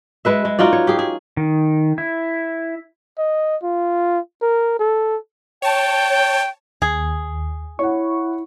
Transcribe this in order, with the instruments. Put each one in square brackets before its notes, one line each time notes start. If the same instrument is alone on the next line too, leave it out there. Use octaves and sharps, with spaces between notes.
[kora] G#3 B4 E5
G#3
D#4 F4 F#4 D5
C#5
G4 G#4
G#4
[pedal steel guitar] D#3
E4
[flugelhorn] D#5
F4
A#4
A4
[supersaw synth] C#5 A5 [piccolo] G5
[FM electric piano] D#2 [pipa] G#4
[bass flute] E4 [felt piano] C#5 F#5 [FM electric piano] C#6